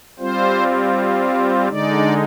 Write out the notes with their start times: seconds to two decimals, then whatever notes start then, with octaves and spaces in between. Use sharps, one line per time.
0.19 G3 C4 F4 C5
1.68 D3 G#3 D#4 D5